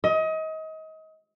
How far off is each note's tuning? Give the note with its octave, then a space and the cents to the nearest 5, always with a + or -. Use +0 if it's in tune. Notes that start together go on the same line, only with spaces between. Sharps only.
D#5 +30